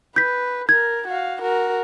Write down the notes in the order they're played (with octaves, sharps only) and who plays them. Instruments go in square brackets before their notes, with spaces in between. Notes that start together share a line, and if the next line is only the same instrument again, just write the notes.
[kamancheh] B4 [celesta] G6 B6
[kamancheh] A#4 [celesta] G#6
[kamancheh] F#4 F5
F#4 A#4